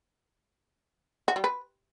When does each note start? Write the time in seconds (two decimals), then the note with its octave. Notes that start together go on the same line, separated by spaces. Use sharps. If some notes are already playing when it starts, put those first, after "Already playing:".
1.28 F#4
1.36 G3
1.44 B4